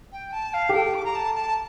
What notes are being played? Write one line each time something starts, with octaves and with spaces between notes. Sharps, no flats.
G5
A5
F5
G4
A4 G5
D6
A#5
A5
A5